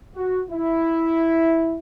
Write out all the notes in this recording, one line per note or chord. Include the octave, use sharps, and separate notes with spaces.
F#4
E4